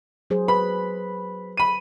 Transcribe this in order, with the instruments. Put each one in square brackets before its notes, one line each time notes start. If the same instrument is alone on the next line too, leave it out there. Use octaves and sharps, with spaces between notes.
[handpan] F#3 G#4 C5
[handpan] B4 [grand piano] B5
[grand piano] B5 D#7